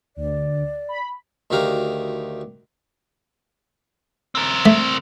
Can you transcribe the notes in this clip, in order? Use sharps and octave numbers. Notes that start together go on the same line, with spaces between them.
D2 D5
B5
D2 D#3 F#4 G4 F5 A#5
C4 A#4
A3